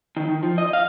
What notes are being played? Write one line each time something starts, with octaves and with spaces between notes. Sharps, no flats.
D#3
D#3
F3
D#5
F5